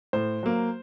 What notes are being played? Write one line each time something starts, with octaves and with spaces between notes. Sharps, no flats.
A2 C5
F#3 A#3